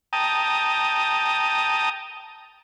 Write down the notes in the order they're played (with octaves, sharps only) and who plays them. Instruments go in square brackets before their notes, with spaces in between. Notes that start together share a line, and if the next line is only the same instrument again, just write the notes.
[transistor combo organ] G5 A5 A#5 D#6